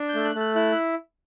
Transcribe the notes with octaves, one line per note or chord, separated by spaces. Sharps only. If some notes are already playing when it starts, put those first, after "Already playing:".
Already playing: D4
G6
A3
F#6
A3
F#6
E4 F#6